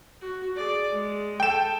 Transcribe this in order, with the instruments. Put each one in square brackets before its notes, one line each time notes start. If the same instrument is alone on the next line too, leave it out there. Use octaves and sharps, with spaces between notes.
[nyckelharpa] F#4
G#4 D5
G#3
[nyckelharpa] A4 [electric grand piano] G5 E7